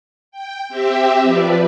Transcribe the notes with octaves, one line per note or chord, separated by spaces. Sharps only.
G5
C4 G4 E5
F3 B4 D5